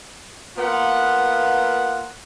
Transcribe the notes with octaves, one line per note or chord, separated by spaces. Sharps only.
A#3 B3 F4 F#5